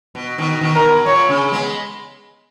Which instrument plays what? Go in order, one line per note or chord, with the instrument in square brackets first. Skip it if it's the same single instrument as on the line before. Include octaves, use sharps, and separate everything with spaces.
[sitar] B2
B2 D#3
B2 D#3
[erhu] A#4
[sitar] B2
[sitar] A#2 [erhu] C#5
[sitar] C#3
G#3 B3